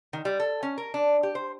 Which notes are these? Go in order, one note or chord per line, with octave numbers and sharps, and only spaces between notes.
D#3
G3
A4
C#4
A#4
D4
G4
C5